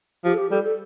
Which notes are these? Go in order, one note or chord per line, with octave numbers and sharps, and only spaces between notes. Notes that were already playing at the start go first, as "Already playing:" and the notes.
F3 G4
A4
G4
G3 A4
A4